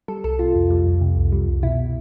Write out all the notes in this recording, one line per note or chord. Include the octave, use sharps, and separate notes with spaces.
G3 A4
C2 A4
C3 F4
F2
G3
F2
C3
C2
G3
C2
B2 E4